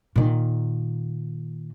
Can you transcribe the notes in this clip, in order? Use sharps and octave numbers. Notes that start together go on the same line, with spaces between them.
A#2 D#3